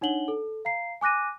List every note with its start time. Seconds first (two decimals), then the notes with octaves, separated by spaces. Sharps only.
0.01 D4 D#4 C#5 F#5 F#7 G7
0.28 A4
0.65 F5 A#5 C7
1.01 G#5 D6 F#6 A#6 D#7